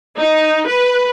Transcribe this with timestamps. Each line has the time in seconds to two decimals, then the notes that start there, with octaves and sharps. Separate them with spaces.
0.18 D#4
0.69 B4